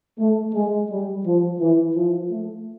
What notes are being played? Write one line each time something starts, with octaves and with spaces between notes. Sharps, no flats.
A3
G#3
G3
F3
E3
F3
A3